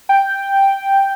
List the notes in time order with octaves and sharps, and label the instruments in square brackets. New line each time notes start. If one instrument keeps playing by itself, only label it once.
[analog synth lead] G5